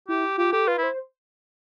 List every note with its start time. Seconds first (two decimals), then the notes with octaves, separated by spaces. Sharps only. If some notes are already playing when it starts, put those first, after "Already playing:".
0.08 E4 G4
0.38 F4 G4
0.53 G4 A4
0.68 F4 B4
0.78 E4 C5